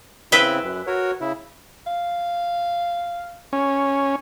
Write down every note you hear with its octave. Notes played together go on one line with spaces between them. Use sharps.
C#3 C4 E4 B4 E5 G5
F#2
F#4 A#4 C#5
C#3 E4
F5
C#4